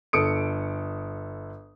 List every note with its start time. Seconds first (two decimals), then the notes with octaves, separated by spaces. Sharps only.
0.13 G1 A4 D#6 C#7 D7